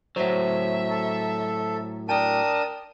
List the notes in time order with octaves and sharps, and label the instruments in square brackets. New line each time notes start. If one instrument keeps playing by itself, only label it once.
[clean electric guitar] A2 F#3 [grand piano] C5 C#5 F#5 [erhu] E5
[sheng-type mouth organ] A4
[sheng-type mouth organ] D4 A#4 A5 [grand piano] G5 [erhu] D#6